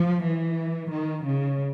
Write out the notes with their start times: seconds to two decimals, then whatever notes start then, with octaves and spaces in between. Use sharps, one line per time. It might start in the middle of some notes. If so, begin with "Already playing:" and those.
Already playing: F3
0.24 E3
0.91 D#3
1.24 C#3